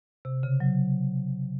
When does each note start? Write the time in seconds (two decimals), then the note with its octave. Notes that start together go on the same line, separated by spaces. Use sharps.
0.25 C3
0.43 C#3
0.60 F#3